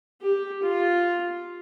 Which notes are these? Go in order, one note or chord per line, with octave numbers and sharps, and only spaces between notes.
G4
F4